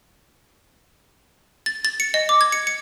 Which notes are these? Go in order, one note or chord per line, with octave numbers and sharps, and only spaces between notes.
A6
A6
C#7
D#5
D6
G#6
C#7
C#7